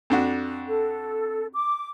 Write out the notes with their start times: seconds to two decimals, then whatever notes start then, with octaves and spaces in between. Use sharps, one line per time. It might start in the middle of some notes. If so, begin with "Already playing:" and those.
0.10 F2 D4 F#4
0.69 A4
1.54 D6